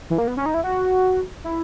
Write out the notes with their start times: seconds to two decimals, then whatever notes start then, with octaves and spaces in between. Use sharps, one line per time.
0.10 E3
0.18 A#3
0.28 B3
0.37 C#4
0.46 D#4
0.54 E4
0.64 F#4
1.44 E4